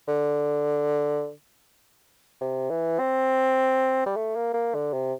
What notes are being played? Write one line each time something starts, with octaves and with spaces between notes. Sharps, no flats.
D3
C3
E3
C4
G3
A3
A#3
A#3
D3
C3